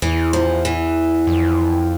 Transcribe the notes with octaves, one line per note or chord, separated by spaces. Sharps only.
E2 E3
F3
E3
F2